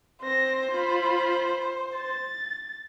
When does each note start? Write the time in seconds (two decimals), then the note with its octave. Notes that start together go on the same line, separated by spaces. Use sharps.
0.22 C4 C5 A#6
0.71 F4 B5
1.97 A6